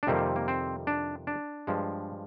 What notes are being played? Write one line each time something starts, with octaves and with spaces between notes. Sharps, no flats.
D4
F2 C3 D#3 G3 A#3 C4
A#3
C4
D4
D4
G2 F3 G#3